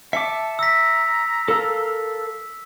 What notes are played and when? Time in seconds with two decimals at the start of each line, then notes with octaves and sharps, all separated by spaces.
0.13 E5 A5 D6 C#7
0.59 A#5 E6 B6
1.48 A4 A#4 F5